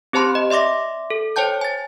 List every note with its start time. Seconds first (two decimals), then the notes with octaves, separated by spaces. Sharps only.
0.13 C4 G4 C5 A5 B5 C6
0.35 D#5
0.50 D5 E5 C6 D6 A#6
1.10 A4
1.36 C5 C#5 G5 A5 G6
1.61 G#5 A6